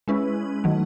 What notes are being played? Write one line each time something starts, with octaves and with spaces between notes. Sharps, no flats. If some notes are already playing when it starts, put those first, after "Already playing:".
G#3 C#4 E4 B4
D#3 F#3 A3